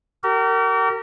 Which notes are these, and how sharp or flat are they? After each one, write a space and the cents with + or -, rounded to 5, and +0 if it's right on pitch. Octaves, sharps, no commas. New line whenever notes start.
G4 -45 A#4 -25